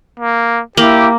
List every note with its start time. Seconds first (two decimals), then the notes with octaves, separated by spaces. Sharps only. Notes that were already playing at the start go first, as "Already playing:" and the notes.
0.20 A#3
0.77 A#3 E4 G4